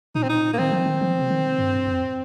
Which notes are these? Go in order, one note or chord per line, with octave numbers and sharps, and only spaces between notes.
A#2 D#4
C4
D#4
A#3
D#3 C4
F3
D#3
F3
C3
D#3
G2
F2